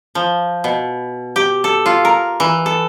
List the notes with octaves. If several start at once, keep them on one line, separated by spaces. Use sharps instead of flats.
F3
B2
G4
A4
F4
A#4
E3
A4